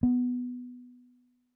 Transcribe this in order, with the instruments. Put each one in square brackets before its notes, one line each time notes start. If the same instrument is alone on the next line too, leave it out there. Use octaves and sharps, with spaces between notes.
[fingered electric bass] B3